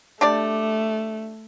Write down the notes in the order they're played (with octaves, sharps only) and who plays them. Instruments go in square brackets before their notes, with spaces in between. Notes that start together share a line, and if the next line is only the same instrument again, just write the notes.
[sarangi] A3 [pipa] D4 G4 D5